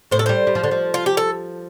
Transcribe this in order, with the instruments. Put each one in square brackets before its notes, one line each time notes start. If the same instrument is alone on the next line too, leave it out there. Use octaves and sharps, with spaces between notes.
[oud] A2 [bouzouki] C5
[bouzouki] A4
[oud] G3 [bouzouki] C5
[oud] G3
F3
D3
F3
[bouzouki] F4
G4
A4